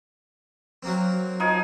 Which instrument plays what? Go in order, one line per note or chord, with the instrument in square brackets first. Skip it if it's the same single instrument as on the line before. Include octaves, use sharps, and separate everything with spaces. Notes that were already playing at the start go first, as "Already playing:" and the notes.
[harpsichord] F#3 A#3 C4
[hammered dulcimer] F3 D#4 G#5